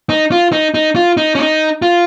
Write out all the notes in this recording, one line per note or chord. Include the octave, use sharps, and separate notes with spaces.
D#4
F4
D#4
D#4
F4
D#4
C#4
D#4
F4